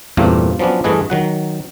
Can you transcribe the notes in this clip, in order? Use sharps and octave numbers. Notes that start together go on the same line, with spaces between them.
E2 G2 A#2 A3 A#3 C4
F3 F#3 B3 C#4 D4
G2 E3 A3 G#4 B4 D#5
D#3 F#3 F#5